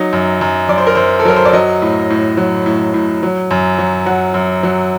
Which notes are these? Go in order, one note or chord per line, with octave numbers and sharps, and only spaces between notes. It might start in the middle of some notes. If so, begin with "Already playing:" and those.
Already playing: F#3 D#4
F#2
F#2
F#2 D5
C5
A#4
F#2 C5
A4
F#3 A#4
C5
D5
F#3 D#5
A2
A2
F#3
A2
A2
F#3
F#2
F#3
F#3 F#5
F#2
F#3